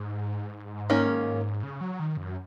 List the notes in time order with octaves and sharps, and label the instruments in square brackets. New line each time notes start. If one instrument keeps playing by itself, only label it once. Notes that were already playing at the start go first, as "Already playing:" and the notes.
Already playing: [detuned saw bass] G#2
[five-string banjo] D#3 A#3 C#4
[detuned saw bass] C#3
F#3
D#3
F#2